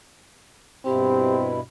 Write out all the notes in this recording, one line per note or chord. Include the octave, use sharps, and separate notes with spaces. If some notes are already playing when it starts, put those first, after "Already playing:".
G2 B2 C4 E4 G4